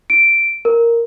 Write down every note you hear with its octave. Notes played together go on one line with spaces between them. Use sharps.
D7
A#4